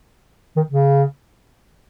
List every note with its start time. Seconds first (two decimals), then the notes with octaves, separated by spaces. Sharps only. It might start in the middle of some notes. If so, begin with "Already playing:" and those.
0.56 D#3
0.71 C#3